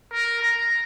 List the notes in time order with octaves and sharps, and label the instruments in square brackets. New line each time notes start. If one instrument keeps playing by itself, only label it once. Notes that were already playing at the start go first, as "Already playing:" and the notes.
[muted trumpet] A#4
A#5